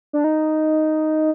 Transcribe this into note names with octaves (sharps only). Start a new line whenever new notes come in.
D4
D#4